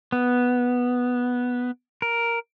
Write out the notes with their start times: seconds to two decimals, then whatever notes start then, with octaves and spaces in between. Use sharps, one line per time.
0.12 B3
2.02 A#4